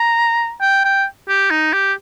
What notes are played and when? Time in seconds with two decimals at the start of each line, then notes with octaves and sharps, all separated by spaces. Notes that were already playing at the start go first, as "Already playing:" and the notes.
Already playing: A#5
0.61 G5
0.85 G5
1.29 G4
1.51 D#4
1.73 G4